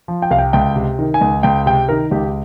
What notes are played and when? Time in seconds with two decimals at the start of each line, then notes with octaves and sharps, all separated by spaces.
0.08 F3
0.22 G5
0.30 C2 F5
0.38 G5
0.53 C#2 G5
0.76 C3
0.99 D#3
1.14 G#5
1.21 C#2
1.43 C#2 G5
1.66 C3 G5
1.89 D#3 A#4
2.11 C#2 G4